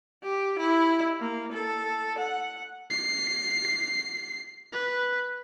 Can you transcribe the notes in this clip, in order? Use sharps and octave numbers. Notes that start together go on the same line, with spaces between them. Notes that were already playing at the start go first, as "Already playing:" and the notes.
G4
E4
A#3
A4
F#5
C7
B4